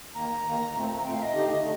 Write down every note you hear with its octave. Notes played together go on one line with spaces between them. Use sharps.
D#2 D#3 A#3 A#5
D#2 D#3 A#3
A#2 A3 C4
A#2 A3 C4 G5
F5
D#5
D3 A3 D#4 G4
D3 A3